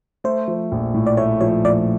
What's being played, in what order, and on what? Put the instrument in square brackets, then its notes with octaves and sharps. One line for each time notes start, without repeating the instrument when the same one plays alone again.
[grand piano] A3 [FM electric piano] C5
[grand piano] F3
A#1
A2
[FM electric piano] D5
[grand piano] A3 [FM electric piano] C#5
[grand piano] F3 [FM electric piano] C#5
[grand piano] A#1 [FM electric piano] D5